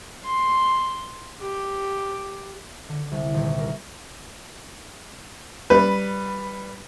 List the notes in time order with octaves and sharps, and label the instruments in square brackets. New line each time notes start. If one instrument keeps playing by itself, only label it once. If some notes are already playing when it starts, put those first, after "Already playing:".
[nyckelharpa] C6
G4
[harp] D3
C2
D#1
A#4
[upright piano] G3 B4